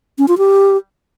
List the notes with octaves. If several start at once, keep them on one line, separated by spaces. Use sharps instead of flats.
C#4
F4
G4